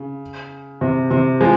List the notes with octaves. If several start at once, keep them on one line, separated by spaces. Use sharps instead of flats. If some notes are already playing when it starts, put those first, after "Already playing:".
Already playing: C#3
C3
C3
F3 G#3